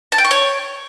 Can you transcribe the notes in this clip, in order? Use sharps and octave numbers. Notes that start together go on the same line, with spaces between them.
A5
G5
C#6
C#5